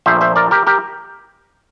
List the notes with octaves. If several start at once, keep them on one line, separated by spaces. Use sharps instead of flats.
A#1 A#2 F3 A3 C5 E5
C5 E5
A#4 D5
G4 A#4
G4 A#4